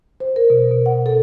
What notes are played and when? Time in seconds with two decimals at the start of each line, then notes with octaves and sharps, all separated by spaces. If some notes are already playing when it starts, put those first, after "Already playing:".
0.20 C5
0.36 A#4
0.50 B2
0.72 B2
0.86 F#5
1.06 A4